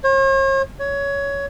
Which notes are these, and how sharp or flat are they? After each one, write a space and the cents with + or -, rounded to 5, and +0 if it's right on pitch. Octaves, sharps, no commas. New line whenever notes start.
C#5 -45
C#5 +15